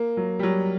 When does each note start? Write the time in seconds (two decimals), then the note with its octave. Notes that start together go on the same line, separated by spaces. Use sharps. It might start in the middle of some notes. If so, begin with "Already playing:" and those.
Already playing: A#3
0.17 F#3
0.39 G3
0.43 F#3